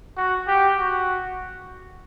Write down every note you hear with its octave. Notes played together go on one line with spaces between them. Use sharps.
F#4
G4
F#4